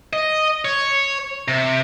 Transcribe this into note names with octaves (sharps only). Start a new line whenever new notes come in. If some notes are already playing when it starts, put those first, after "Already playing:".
D#5
C#5
C3